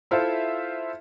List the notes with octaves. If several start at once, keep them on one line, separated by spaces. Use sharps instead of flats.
E4 F4 A4 C5 E5 F5